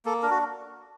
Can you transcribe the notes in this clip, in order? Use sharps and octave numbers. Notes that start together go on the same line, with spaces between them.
A#3 A4
D4 A#4
F#4